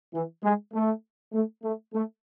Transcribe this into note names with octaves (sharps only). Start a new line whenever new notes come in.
E3
G#3
A3
A3
A3
A3